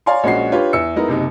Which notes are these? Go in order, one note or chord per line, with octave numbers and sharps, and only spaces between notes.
C#5 D5 F5 G#5 A#5 C6
A#1 G#3 C#4 F#4 C7
D4 F4 G4 B4 C#5
E2 E5 E6 C#7
G#3 B3 D#4 E4 A#4
F#1 C3 D#4